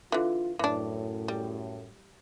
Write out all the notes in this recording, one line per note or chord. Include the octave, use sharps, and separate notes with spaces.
D3 E3 F4
F#2 A2 E3 D4
G3